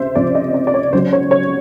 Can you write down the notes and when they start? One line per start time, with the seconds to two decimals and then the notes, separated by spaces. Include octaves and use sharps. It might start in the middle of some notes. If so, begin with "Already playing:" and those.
Already playing: C#2 C3 C5 E5
0.15 C#2 C3 F3 D5
0.35 D#5
0.54 D5
0.67 D5
0.74 C#5
0.93 C#2 C#3 F#3 C5
1.13 C#5
1.31 C#5